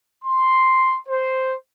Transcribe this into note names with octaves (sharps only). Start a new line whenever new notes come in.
C6
C5